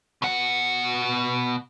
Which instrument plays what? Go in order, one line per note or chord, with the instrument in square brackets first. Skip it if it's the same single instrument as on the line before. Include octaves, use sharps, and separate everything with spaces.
[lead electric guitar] B2 F#5